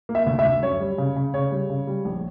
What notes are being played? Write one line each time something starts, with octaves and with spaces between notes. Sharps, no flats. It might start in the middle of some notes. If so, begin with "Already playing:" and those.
A#3
E5
D2
E5
D2
F#2 C#5
G3
C#3
C#3
C#3 C#5
G3
C#3
G3
A#1